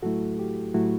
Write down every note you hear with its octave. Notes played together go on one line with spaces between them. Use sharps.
A2 F#3 A3 E4 F#4 A4
G4
A2 F#3 A3 E4 F#4